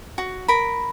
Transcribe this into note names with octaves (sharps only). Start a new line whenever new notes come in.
F#4
A#4 B5